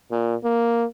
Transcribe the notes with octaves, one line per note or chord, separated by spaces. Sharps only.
A#2
A#3